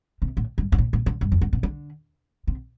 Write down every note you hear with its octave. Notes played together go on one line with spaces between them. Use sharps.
C3
A2
G2
G2
A2
A2
D3
G2
F2
G2
C3
D3
C3